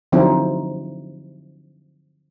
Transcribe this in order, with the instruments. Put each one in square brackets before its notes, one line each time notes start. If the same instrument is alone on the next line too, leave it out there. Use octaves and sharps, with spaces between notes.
[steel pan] D3 F3 F#3 C4 D#4 E4